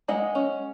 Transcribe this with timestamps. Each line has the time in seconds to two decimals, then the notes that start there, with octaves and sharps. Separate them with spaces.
0.08 G#3 D#5 F#5
0.35 C#4